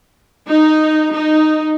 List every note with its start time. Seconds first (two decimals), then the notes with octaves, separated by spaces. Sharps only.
0.47 D#4
1.15 D#4